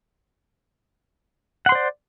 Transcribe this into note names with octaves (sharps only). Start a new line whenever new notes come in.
C5 D5 F#5 C6